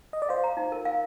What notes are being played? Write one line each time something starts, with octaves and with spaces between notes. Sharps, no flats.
D#5
D5
C5 F5
A#5
D#4
A#4
F5